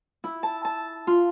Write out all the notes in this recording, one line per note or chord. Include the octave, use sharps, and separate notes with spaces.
E4
A5
A5
F4